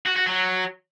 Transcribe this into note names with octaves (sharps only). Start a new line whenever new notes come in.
F#4
F#4
F#3